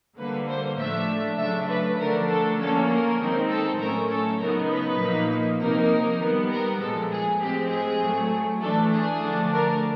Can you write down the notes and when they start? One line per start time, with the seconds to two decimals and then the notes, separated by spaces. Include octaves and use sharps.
0.18 D3 G3 A#3 B4
0.48 C5
0.78 A2 F3 A3 D4 E5
1.38 C#3 F#3 A3 D4 E5
1.69 B4
1.98 D3 F3 A3 D4 A#4
2.29 A4
2.59 F3 A#3 C#4 A4
2.89 A#4
3.20 D#3 G#3 C4 D#4
3.50 A4
3.79 A2 F#3 A3 C#4 A#4
4.10 A4
4.40 C#3 F#3 B3 D#4 A#4
4.71 B4
5.00 A#2 F3 A#3 D#4
5.60 C3 F3 A#3 D#4 A#4
6.20 D#3 G3 B3
6.51 A#4
6.82 A#2 F3 G#3 A4
7.11 G#4
7.41 A2 F3 G#3 C4 G4
7.71 G#4
8.02 A2 F#3 A3
8.61 E3 A3 D4 A4
8.91 G#4
9.22 D3 F3 A3 D4
9.52 A#4